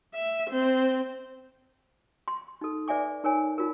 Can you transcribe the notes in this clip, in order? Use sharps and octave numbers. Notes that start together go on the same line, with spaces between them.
E5
C4
C6
D#4 A4
B4 D5 E5 G#5 D6
D#4 A#4 C#5 G#5
D#4 F4 A#4